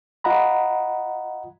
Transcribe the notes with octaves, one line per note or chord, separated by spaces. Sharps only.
F4 D#5 F#5 A#5 B5